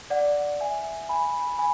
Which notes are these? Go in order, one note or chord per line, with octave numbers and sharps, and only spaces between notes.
D5 F#5
E5 G#5
G#5 B5
G#5 B5